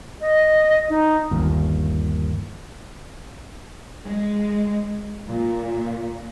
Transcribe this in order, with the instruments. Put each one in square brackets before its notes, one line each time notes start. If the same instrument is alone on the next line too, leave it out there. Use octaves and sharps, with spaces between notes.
[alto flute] D#5
D#4
[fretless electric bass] G1 D#2
[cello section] G#3
A#2